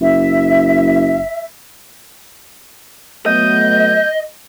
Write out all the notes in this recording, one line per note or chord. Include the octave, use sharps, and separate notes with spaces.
F#1 E5
F#3 A3 B3 D#5 G6